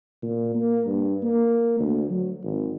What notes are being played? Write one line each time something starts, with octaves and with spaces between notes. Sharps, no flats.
A#2
A#3
G2
A#3
D2
F#3
G#1